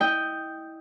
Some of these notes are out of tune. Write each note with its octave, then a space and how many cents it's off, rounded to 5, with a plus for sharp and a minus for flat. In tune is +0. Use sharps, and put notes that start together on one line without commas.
E4 -25 D#5 +0 G5 +0